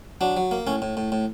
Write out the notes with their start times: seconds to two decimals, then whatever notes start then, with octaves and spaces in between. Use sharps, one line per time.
0.21 F#3 D4
0.37 F#3
0.51 A#3
0.67 A2 C#4
0.82 A2
0.97 A2
1.12 A2